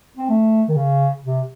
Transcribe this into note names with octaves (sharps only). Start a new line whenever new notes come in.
C4
A3
D#3
C#3
C3